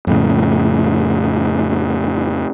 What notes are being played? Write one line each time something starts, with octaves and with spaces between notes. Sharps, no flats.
F2 A2 C#3